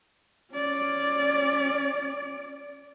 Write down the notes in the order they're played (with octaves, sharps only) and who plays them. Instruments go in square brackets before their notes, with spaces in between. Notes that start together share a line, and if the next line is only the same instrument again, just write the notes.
[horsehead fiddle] C#4 D5